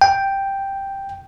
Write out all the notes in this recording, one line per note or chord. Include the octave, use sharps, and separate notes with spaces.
G5